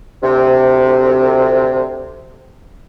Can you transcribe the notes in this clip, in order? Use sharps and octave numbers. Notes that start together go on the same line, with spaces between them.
D2 C3